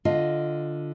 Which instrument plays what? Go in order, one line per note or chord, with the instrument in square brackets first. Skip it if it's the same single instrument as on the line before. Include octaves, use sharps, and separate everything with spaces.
[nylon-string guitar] D3 F4 D#5